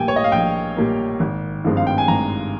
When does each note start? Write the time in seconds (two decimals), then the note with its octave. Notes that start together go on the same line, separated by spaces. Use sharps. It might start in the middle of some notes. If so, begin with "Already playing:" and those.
Already playing: A#1 A#2 G3 A#3 G5 G#5
0.08 C#5
0.16 D#5
0.24 F5
0.32 A#1 G5
0.77 A#2 G3 A#3
1.20 G#1
1.64 G2 F3 G#3 C4
1.77 F5
1.87 G5
1.98 G#5
2.08 G#1 A#5